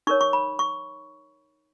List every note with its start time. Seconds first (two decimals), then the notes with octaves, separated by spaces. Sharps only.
0.07 D#4 A#4 C#5 C#6
0.21 C#6
0.33 B5
0.59 C#6